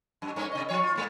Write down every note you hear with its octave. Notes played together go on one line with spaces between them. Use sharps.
F#2
G2 A#3 C#4
C3 D#5
F3 C#5
F4
A#2 G#3 A#3